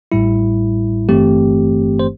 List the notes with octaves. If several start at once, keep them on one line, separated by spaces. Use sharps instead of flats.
A1 A2 G3 E4
G1 G2 E3 A3 C4 G4
C5